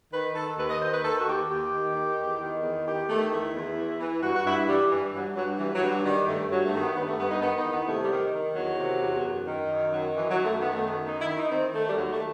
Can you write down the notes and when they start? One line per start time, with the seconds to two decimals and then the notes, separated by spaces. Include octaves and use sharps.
0.13 D#3 B4
0.36 D#3 A4
0.58 D#2 B4
0.70 D#5
0.81 D#3 C5
0.93 B4
1.04 D#3 A4
1.19 F#4
1.27 D#2 G4
1.49 D#2 G4
1.72 D#3
1.96 D#3
2.18 E2
2.41 D#3
2.63 E2
2.86 D#3 G4
3.09 D#3 A3
3.32 E2 E4
3.55 E2
3.77 E3
4.00 E3
4.23 G2 F#4
4.35 F#4
4.46 G2 E4
4.68 E3 G3
4.91 G2 E3
5.14 G2 F#3
5.36 G2 F#3
5.59 G2 E3
5.75 F#3
5.83 G2
5.90 F#3
6.05 D#3 G3
6.27 G2 A3
6.50 G2 F#3
6.66 A3
6.74 D#3
6.81 B3
6.96 G2 B3
7.08 A3
7.18 G2 B3
7.30 D#4
7.42 D#3 B3
7.57 D#4
7.64 E2
7.72 B3
7.87 C3 A3
8.03 G3
8.10 D#3
8.33 D#3
8.55 E2 F#3
8.78 C3
9.01 E2
9.24 F#2
9.47 D#3
9.69 F#2
9.92 D#3 F#3
10.15 F#2 E3
10.31 F#3
10.38 F#2
10.45 A3
10.60 D#3 B3
10.73 A3
10.83 F#2 B3
11.06 D#3 D#4
11.21 E4
11.28 D#3
11.36 D#4
11.51 D#3 C4
11.74 D#3 A3
11.89 G3
11.97 D#2 F#3
12.12 A3